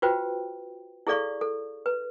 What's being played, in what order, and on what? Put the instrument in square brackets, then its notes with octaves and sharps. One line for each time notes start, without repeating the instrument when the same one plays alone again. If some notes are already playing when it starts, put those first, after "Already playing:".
[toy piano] F4 F#4 B4 C5 G5
E4 G#4 A4 D5 F5 C#6
A4
B4